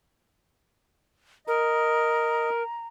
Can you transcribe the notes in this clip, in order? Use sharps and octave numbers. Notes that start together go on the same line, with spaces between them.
A#4 D#5 A#5